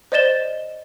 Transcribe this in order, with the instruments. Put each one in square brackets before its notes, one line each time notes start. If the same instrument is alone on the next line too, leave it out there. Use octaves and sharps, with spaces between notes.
[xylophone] C5 D5 D#5 A6 E7 G7